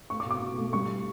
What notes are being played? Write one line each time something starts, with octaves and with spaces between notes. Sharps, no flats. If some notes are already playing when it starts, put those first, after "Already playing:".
A3 C#6
D6
B2
D6
B2
A3
G3 C#6